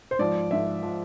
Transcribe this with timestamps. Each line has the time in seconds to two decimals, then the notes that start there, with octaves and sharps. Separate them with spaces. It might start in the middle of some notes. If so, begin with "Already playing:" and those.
0.11 C5
0.19 G#2 F3 D5
0.50 G#2 F3 E5
0.83 F3